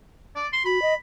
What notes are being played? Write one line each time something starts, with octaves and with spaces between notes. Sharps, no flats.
D5
C6
F#4 B5
D#5